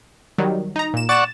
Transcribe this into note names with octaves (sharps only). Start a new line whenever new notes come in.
D#3 F#3 G3
D#4 A#5
A#2 E7
D5 F#5 C#6 A6 E7